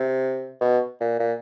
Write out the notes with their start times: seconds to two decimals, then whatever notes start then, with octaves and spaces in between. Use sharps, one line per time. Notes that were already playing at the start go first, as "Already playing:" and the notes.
Already playing: C3
0.61 B2
1.01 A#2
1.20 A#2